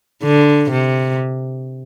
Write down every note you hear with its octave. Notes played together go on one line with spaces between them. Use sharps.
D3
C3